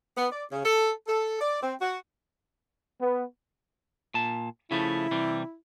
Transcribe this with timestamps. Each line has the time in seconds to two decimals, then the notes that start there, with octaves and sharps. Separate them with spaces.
0.17 B3
0.32 D5
0.52 C#3
0.64 A4
1.07 A4
1.40 D5
1.62 C4
1.81 F#4
3.01 B3
4.14 A#2 A5
4.71 C#3 F3 A3 E4
5.11 C3 E3 G3